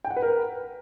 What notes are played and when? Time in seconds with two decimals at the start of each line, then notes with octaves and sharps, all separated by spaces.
0.05 G5
0.10 F#5
0.16 B4
0.22 A#4